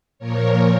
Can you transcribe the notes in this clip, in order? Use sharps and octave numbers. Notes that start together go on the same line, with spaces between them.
A#2 F3 A#4 C#5